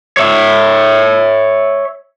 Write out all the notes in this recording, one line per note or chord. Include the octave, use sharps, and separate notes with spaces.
C#5 E5